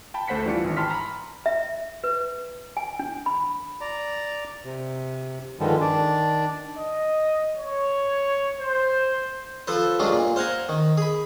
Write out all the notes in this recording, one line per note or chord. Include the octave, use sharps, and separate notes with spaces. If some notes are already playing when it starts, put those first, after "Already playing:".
G5 A5 B5
D2 A3 C5 F#5 B6 C#7
E3 G3 D4 F4 C#7
G#1 E3
G5 A5 B5 C6 F6 B6
A#5 B5
E5
B4
G#5
D4
B5
D5 A#5
C3
G2 D3 D#3 F3 G3 G#3
D#3 D4 D5
D#5
C#5
C5
F3 A4 B4 C5
G2 F#3 G#3 D4 F4
A#2
C5 F5 F#5 G#5 A#5
D#3
G#4 B5